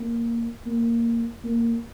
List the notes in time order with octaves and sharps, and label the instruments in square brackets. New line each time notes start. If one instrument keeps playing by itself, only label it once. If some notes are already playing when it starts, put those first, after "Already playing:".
Already playing: [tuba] A#3
A#3
A#3